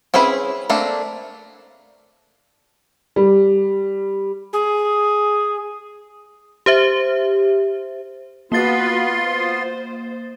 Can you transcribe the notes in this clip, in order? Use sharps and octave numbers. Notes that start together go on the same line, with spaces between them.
C4 C#4 E4 G#4 B4
A3 A#3 C4 D4
G3
G#4
G4 C5 E5
A#3 B3 F4 F#4 B4 C6 A6
C5